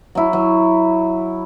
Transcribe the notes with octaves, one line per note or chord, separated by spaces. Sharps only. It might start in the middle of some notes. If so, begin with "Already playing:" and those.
F#3 E4
F#3